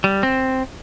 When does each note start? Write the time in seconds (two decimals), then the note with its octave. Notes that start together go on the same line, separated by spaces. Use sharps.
0.04 G3
0.23 C4